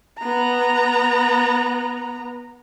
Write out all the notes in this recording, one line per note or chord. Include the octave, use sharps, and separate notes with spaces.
B3 A#5